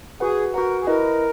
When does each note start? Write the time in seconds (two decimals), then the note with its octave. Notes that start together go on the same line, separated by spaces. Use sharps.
0.20 F#4 G#4 B4 F#5
0.54 F#4 A#4 B4 F#5
0.81 G#4
0.87 E4 A#4 B4 D#5